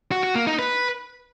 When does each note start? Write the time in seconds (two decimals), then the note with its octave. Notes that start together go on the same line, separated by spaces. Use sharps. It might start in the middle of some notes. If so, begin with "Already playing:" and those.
0.12 F#4
0.23 F#4
0.35 A#3
0.47 D#4
0.59 B4